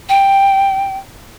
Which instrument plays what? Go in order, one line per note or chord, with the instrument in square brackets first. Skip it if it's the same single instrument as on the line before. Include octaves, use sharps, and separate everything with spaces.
[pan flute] G5